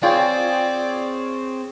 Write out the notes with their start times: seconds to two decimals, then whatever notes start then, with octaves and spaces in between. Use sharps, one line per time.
0.03 C4 F4 G#4 C#5 D5 G5